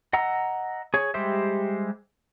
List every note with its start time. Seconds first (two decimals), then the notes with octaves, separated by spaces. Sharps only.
0.13 D#5 F#5 A#5 E6
0.94 G#4 C#5
1.14 G3 G#3 G4 C5 E5